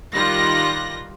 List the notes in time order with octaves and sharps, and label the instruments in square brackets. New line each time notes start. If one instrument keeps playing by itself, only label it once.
[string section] D#3 G3 F4 G4 F#6 A#6